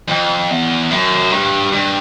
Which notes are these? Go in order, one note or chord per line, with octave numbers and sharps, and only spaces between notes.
F2
E2
F#2
G2
G2